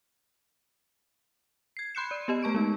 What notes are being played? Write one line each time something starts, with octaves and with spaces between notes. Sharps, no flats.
G#6 C7
B5 C6 F#6 G6 C#7 E7
D5
B3 G4 D#5
A3 A5 C#6 D7
G#3 D#4